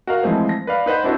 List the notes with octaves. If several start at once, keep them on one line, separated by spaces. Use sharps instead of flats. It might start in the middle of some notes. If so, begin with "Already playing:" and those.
F#4 A#4 F5
E3 F3 G#3 A3 C4
A#6
B4 D5 F5
D#4 B4 C5 F#5
C4 D4 E4 F#4 C5